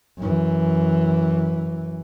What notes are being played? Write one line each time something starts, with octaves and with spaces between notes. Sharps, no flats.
F#2 E3